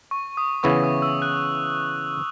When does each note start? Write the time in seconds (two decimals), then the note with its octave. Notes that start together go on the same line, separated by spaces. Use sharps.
0.11 C#6
0.37 D#6
0.63 C#3 E3 B3 E4 C#6
0.84 D#6
1.02 E6
1.22 F#6